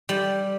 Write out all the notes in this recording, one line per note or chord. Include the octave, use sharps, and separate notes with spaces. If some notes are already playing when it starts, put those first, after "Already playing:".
G3